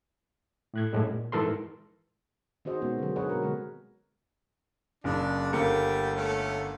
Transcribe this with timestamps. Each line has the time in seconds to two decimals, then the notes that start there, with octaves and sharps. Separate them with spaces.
0.74 A2 F#6 G#6
0.93 F#2 A2 G#3
1.05 A#2
1.32 G#2 E3 A4 A#4 C6
2.65 D#3 C#4 F#4 G#4 C5 D#5
2.81 B2 G#3 A#3 B3 C#4 F#4
2.99 D3 D#3 F#3
3.16 F#4 G#4 B4 C#5 D#5 F#5
3.29 B2 A#4
3.42 D3 G#3 C4 A4
5.04 F#1 C#3 D4
5.53 G1 G3 A#3 G5 C#7
6.16 A3 C#4